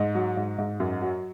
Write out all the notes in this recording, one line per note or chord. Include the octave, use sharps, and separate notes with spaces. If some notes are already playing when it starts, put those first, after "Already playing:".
Already playing: G#2 D#5
F#3
G#2
G#2
F#2
F#3